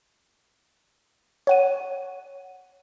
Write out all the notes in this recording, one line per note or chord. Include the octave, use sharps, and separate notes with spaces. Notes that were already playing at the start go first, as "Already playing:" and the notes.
C#5 F#5 D#7